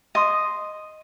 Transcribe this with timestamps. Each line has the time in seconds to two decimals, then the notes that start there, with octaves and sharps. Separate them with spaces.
0.15 D#5 C6 D#6